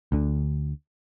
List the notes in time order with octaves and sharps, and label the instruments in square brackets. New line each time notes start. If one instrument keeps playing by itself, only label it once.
[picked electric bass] D2 D3